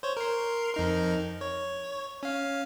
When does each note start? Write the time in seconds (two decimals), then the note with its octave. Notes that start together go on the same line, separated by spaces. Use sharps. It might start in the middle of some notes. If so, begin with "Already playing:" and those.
0.03 C5 C#5
0.17 A#4 C6
0.74 F2 D#4 A#4
1.41 C#5
2.23 C#4 F5